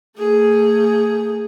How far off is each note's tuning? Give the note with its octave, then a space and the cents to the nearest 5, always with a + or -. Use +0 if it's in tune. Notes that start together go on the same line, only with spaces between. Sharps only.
A3 +40 G#4 +0